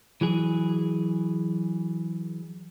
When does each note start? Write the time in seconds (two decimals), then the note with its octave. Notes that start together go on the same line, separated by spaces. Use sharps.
0.21 E3 F#3 G#4